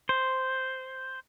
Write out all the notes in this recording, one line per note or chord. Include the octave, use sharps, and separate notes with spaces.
C5